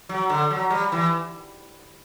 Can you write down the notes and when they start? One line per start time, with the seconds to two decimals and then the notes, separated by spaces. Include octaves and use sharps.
0.09 F#3
0.30 D3
0.51 F#3
0.70 G3
0.92 E3